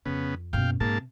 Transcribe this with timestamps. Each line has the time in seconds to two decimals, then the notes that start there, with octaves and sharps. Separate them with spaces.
0.06 F2 C#3 B3
0.53 F#1 B2 F5 G5
0.80 G#2 C3 A#3 A5